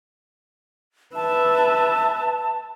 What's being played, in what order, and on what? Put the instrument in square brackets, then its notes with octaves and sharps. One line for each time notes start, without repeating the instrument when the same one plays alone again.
[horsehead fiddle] B4 E5 [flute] A5